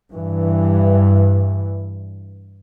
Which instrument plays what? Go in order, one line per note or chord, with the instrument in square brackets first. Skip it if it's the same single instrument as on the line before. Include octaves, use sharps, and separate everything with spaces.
[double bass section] G2 E3